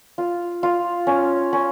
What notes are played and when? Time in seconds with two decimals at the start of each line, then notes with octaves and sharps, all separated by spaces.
0.18 F4
0.63 F4
1.07 C#4
1.53 C#4